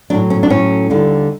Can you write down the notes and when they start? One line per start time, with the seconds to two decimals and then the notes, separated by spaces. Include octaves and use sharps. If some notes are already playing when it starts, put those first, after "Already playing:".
0.10 A2 F#3 D4
0.30 C#4
0.43 D4
0.50 A2 F#3 C#4
0.90 D#2 D3 G3